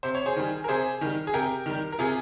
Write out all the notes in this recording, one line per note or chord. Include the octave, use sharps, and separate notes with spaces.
C3 C5
C#5
G#4 C5
D#3 G3
A#4
C3 G#4 C5
D#3 G3
G#4
C3 G4 A#4
D#3 G3
A#4
C3 F4 G#4